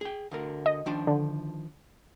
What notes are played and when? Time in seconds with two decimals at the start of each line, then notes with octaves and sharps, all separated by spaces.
0.01 G#4 G5
0.31 D2 D3 A#4
0.66 D#5
0.86 D#3 F3 D4
1.07 D3